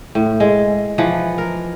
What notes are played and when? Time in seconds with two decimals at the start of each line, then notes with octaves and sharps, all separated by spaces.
0.15 A2
0.40 G#3
0.98 E3 F3 F#5
1.38 A#4